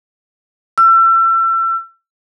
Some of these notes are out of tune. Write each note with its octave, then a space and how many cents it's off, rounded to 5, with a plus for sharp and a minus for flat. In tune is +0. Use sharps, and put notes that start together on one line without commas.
E6 +35